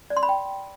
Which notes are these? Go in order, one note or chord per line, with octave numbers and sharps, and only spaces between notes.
D5
C6
B5
G5